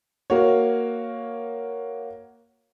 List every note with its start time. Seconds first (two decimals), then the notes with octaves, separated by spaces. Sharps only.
0.30 A#3 F#4 C#5